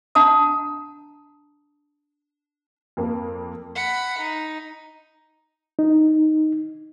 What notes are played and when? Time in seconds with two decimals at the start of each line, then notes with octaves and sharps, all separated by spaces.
0.15 D4 F#5 A5 A#5 D#6
2.97 F2 A#3
3.75 F#5 B5
4.20 D#4
5.79 D#4